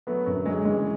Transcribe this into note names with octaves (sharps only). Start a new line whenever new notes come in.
F#3 A3 B3
F#2 D3 F#3
D3 F#3 G#3
C#3 E3 G#3